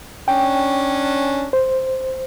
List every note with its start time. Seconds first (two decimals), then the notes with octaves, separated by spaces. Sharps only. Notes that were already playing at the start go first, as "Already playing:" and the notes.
0.28 C#4 D4 G5
1.53 C5